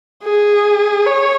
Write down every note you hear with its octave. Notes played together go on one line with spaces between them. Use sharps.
G#4
C#5